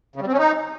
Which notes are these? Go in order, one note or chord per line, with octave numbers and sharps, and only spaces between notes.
C#3
G3
C4
C#4
D#4